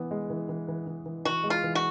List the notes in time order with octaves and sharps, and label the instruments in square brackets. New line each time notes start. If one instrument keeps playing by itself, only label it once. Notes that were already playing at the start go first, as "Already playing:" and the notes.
Already playing: [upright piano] E3 B3
G#3
E3
E3
E3
E3
E3
[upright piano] E3 [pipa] F#4
[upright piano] G#3
[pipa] F4
[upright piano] E3
[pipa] F#4